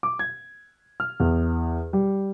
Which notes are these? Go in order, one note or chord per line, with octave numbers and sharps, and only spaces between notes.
D6
G#6
F6
E2
G3